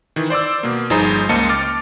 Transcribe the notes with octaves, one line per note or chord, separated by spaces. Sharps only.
D#3 E3
C5 D5 D6 E6
B2 A#3
G1 F3 D#4 G#4 C5 A#5
C#2 A#3 C5 D#5 A5 C#7
D6 F6 A6